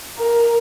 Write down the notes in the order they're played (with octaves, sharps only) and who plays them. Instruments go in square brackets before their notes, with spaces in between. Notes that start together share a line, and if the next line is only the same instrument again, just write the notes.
[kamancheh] A#4